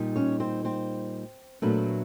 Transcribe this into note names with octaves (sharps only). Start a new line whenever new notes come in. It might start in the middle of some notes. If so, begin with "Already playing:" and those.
Already playing: A#2 G3 D#4
C#4 C#5
C4 C5
C4 C5
A#2 F#3 A3 B3 D4 B4